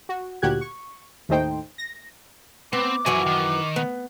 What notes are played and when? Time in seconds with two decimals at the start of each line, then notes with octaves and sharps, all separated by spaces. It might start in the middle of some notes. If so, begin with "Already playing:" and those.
0.09 F#4
0.42 D2 A#2 F#4 G4 F#6 G#6
0.61 C#6
1.29 D#2 A2 A3 D#4 C5 G5
1.78 A#6
2.73 B3 C4 D6
3.06 F#2 E3 F3 F#4 G#5
3.26 D#3
3.76 B3